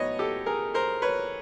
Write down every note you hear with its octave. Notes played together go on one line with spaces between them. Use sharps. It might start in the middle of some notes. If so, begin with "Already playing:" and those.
Already playing: A2 F#3 B3 D#4 C#5 D#5
G4 A4
G#4 A#4
A#4 C5
B4 C#5